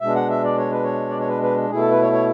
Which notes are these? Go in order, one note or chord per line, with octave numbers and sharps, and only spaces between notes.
B2 G#3 D4 E5
F#5
E5
D5
C#5
B4
C#5
D5
C#5
B4
B4
B2 A3 E4 G#4
A4
B4
C#5
C#5